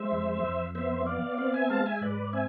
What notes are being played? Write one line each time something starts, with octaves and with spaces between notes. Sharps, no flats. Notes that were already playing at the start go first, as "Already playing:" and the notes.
Already playing: G#3 C5 E5
F2
F2
B3 C5 E5
B3 D5 F5
C4 D5 F5
E5 G#5
G#3 F5 A5
E5 G#5
E5
G#2 B4 D5
C4 E5 G#5